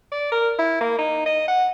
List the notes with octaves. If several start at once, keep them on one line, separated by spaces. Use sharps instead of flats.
D5
A#4
E4
A#3
D#4
D#5
F#5